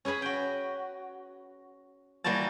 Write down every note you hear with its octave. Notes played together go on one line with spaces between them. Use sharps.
C#4 G#4 B4 G#5 B5
F#4 G5
E3 G3 A#3 F#4 A5